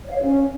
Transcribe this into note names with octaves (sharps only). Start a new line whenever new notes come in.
C#5
F5
C#5
C#4